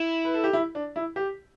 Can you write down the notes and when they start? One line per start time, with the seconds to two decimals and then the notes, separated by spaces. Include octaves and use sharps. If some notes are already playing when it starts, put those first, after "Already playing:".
Already playing: E4
0.25 B4
0.34 A4
0.44 G4
0.53 E4
0.75 D4
0.96 E4
1.16 G4